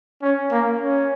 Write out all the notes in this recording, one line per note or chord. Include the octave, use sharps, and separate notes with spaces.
C#4
A#3
C#4